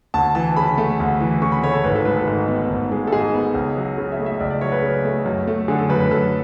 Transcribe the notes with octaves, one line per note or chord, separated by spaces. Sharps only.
D2 A5
E3 A5
C#3 B5
A3
D2
E3
C#3 C#6
B5
A3 C#5
A4
G#1 B4
A4
G#3 B4
A4
G#2
B3
G#1
G#3
A4
G#2 G#4
B3
C#2
F#3
C#3
E5
A3
E5
C#2 D5
D5
F#3 C#5
B4
C#3
A3
F#2
A3
D3 G#4
A4
F#2 B4
B4
F#2 A4